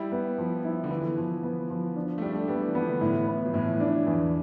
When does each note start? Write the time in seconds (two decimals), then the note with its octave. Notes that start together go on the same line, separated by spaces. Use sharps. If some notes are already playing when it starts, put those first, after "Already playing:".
Already playing: G3 E4
0.12 B3
0.38 F3
0.65 E4
0.84 D3
0.90 E3 B3
1.17 F3
1.43 B3
1.70 F3
1.96 D4
2.18 A3
2.22 G3 D4
2.36 A3
2.48 G3 B3
2.62 E3
2.74 F3 B3
2.89 D3
3.01 A2 E3
3.28 B3
3.45 F3
3.53 A2 E3
3.80 D4
4.06 E2